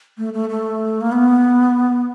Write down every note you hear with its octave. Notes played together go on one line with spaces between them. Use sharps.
A3
A3
A3
A#3
B3